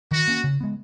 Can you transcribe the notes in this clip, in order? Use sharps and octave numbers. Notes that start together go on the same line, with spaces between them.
D#3 F#4
A#3 C#4
C#3
G#3 B3